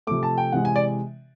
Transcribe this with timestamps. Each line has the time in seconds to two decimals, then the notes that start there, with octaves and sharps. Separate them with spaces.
0.07 C3 F3 A3 D6
0.23 A5
0.38 G5
0.52 C3 E3 G#3 F#5
0.65 G#5
0.76 D5